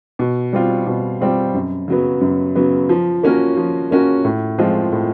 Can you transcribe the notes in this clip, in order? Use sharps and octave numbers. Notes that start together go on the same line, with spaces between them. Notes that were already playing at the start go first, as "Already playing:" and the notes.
B2
G3 C4 F4
B2
G3 C4 F4
F#2
C#3 F#3 B3
F#2
C#3 F#3 B3
F3
A#3 C#4 F#4 A#4
F3
A#3 C#4 F#4 A#4
A2
F3 G#3 C4 F4
A2